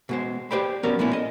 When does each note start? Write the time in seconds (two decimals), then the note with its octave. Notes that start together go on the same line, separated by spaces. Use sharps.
0.09 B2 G#3 C5
0.51 G4 B4 C5 D5 G5 B5
0.83 F#3 B3 C#4 A#4 D5
0.99 A#2 G#3 A3 B3 C#4 E4
1.13 D#5